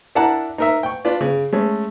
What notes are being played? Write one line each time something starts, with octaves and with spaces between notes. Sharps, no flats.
D4 E4 A#4 F#5 A5 A#5
D#4 A#4 E5
G5 C#6
D4 F4 B4 D5
C#3
G#3 A3 C#4